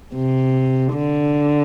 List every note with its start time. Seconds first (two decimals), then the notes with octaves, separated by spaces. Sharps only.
0.14 C3
0.93 D3